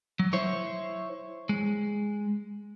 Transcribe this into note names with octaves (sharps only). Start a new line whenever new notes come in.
F#3
E4 C5 C#5
G#3